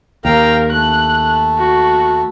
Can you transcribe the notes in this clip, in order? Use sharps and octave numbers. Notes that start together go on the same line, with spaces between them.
D#2 A#4 F5 G5 A#5
A3 F#6
F#4